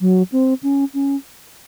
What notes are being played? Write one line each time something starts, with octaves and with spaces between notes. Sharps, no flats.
F#3
C4
C#4
C#4